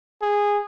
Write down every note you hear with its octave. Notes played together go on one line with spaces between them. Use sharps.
G#4